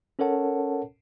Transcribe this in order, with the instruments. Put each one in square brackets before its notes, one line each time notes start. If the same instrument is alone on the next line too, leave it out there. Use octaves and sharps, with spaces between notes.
[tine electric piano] C#4 A4 A#4 C#5 F#5 A5